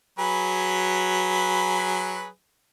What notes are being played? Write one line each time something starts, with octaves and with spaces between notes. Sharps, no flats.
F#3 G#4 B4